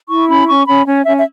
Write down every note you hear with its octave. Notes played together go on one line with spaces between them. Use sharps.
E4 C#6
C#4 B5
C#4 C#6
C#4 B5
C#4 C#5
C#4 E5
E5